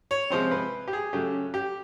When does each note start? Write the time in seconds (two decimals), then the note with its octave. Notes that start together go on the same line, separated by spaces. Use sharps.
0.11 C#5
0.30 C3 F3 G#3 C4 C5
0.51 B4
0.88 G4
0.93 G#4
1.13 C#3 F#3 A3 C#4 G4
1.54 G4